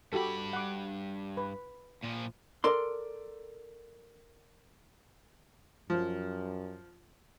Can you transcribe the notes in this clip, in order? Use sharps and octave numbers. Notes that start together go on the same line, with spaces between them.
G2 F#4 G4 A4 B5
F#5 D6
B4
A#2 F3
A4 A#4 D5 C6
F#2 F3